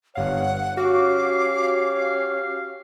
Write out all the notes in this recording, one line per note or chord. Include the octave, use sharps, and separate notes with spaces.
G1 G2 C#5 F5 F#5
C#4 F#4 G4 F5 D6